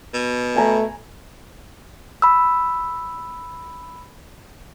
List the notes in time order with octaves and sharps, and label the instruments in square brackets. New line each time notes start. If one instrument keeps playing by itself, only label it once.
[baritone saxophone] B2
[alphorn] A3 [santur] G#5 A#5 B5
[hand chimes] B5 E6